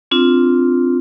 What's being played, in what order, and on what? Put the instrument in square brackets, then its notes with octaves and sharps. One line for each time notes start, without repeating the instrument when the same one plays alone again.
[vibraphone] C4 D4 F4